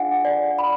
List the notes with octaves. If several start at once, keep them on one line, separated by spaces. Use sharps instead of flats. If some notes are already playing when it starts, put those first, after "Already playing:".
Already playing: D4 F4 G#4 D5 F5 F#5 G#5
D5
B5